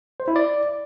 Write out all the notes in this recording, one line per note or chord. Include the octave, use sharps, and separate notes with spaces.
C5
E4
D5